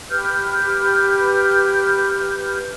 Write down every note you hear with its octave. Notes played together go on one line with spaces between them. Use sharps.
G4 B4 F6 G6